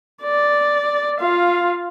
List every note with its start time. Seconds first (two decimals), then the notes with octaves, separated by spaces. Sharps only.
0.23 D5
1.20 F4 F5